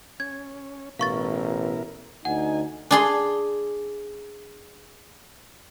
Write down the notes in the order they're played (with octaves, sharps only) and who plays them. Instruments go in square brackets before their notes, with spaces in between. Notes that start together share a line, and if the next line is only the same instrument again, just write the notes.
[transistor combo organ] C#4 [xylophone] G#6
[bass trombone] A1 [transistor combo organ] B2 E4 A#4 [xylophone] F5 C#6 A6
[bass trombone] D2 [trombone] D#4 [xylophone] F#5 [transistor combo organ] G#5
[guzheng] D4 G#4 C6